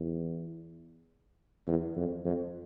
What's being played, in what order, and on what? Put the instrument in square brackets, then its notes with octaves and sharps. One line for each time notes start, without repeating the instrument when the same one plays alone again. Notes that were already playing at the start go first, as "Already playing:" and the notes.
Already playing: [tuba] E2
E2
F2
F2